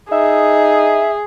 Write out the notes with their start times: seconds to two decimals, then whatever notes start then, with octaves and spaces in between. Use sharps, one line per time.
0.12 D#4 G#4 E5